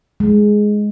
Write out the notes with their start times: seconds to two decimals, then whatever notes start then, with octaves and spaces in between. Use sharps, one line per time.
0.20 G#3